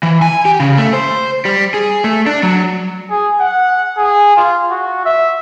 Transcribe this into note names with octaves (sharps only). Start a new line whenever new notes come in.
E3
G#5
G4
C#3
A3
C5
G3
G#4
A3
D4
F#3
G#4
F#5
G#4
F4
F#4
E5